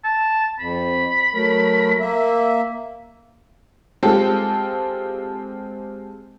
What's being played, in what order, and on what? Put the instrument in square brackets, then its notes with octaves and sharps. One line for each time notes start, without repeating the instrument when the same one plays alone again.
[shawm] A5
[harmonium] F2 [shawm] B5
[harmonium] F#3 A3 A#4
A#3 E5
[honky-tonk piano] G#3 C4 F4 G4 A4